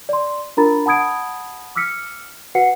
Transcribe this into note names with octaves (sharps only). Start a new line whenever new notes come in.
D5 C6
D4 F4 A#4 A#5 B5 A6
F#5 A5 B5 D#6 G#6 D7
D6 E6 F6 B6 C#7
F#4 B4 F#5 C7 C#7